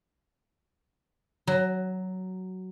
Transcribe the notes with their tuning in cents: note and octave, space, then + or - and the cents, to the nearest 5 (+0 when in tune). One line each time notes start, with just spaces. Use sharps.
F#3 +10